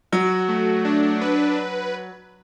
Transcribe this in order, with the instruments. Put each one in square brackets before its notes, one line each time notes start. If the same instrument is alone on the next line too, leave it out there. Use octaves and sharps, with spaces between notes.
[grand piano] F#3 [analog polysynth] F#4
[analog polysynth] A3
D4
B4